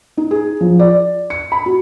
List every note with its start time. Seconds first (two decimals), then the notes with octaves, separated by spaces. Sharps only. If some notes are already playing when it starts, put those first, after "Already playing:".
0.17 D#4
0.31 G#4
0.61 F3
0.79 D5
1.30 C#7
1.52 B5
1.66 F#4